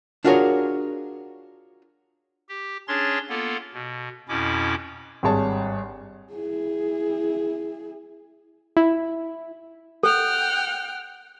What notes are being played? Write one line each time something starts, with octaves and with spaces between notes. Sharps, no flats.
D4 F4 F#4 G#4 A#4 C#5
G4
C#4 D4 G#4 C#5 C6 A6
A#3 B3 F4 A4
B2
F2 B2 C#4 E4 D6
G#1 G2 G#4 C#5 A5
E4 G#4
E4
A4 F#5 G5 F6